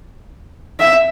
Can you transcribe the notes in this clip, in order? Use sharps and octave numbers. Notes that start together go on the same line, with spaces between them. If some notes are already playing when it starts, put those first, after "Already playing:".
E5